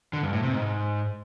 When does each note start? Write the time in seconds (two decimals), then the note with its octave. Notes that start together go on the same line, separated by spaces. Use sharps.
0.13 D3
0.23 G2
0.33 A2
0.43 C3
0.53 G#2